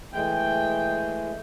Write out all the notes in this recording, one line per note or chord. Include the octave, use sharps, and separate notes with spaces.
E3 G#3 A3 G5